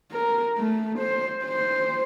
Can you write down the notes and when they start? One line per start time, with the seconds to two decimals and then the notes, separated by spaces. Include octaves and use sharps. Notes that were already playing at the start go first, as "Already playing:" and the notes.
0.13 A#4
0.57 A3
0.99 C5
1.45 C5